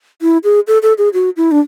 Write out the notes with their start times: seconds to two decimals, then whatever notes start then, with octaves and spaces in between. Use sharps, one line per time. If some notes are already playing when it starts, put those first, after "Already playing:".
0.22 E4
0.44 G#4
0.67 A4
0.82 A4
0.98 G#4
1.14 F#4
1.37 E4
1.52 D4